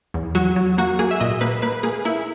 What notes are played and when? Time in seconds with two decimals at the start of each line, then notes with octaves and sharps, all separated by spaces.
0.14 E2
0.35 F#3 F#4
0.56 F#3
0.78 A#3 F#4
0.99 A#3 G#4
1.11 E5
1.20 A#2 D#5
1.41 A#3 B4
1.62 A#3 B4
1.83 A#3 G#4
2.05 A#3 E4